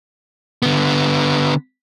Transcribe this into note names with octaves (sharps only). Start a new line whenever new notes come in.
D3 B3